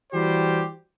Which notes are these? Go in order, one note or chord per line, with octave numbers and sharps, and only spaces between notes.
E3 G3 F#4 G4 C5